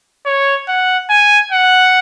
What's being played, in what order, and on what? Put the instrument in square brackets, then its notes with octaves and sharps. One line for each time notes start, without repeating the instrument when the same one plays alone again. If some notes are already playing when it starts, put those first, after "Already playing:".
[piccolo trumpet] C#5
F#5
G#5
F#5